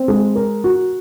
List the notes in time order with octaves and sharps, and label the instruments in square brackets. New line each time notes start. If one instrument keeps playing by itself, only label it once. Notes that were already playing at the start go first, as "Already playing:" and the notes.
Already playing: [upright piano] C4
G#3
A#4
F#4